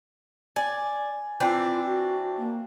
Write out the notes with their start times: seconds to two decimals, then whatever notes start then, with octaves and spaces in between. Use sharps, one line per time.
0.56 D5 G#5
1.40 E3 C4 D4 F4
1.85 F#4
2.37 A#3